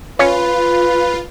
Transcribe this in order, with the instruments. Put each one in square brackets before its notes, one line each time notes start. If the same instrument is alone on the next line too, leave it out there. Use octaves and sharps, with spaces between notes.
[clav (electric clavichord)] C#4 C#5 [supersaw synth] F4 [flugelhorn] B4